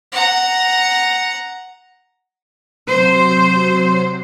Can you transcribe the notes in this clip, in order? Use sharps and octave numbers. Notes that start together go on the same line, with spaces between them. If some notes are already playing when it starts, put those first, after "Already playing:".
F#5 A#5
C3 F#3 C5